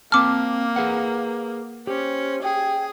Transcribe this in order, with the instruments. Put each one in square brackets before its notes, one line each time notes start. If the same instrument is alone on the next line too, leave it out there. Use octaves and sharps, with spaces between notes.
[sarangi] A#3 [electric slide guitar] C4 A5 [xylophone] D6 F6
[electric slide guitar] G#4 B4 F#5
[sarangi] C#4 [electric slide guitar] G4 [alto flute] C5
[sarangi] G#4 [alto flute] G5